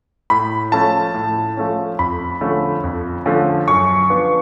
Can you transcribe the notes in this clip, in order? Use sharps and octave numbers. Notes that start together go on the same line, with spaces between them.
A2 B5
F3 A3 C#4 A5
A2
F3 A3 C#4
F2 B5
D3 F3 A3 C#4
F2
D3 F3 A3 C#4
F#2 C#6
F3 B3 D4